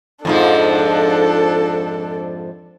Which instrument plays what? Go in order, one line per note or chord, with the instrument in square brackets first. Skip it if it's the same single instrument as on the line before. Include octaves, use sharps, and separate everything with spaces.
[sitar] F2 G#2 F3 [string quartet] D4 A4